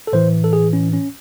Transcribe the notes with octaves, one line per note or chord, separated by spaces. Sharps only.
A4
A2 E3 C5
A4
G#4
C#4
C#4